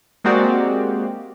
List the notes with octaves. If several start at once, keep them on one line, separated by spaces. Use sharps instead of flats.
G#3 A#3 C4 F#4 G4 D5